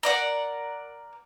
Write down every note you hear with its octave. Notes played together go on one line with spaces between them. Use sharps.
A#4 D5 F#5